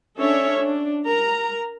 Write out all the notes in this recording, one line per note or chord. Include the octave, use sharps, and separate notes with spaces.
C#4 D4 A4 C#5 E5
D4
A#4 A#5